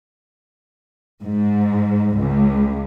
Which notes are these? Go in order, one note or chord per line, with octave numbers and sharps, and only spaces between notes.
G#2
C#2